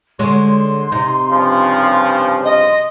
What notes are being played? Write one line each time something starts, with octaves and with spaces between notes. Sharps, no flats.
D3 G#3 C#5 C6
C3 D#4
G2 C#3 F3
D#5